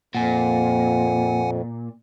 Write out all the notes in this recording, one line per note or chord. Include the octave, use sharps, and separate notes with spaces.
F2 A#2 F#5 G#5